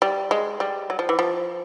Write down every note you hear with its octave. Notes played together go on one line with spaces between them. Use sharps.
G3
G#3
G3
F#3
F3
E3
F3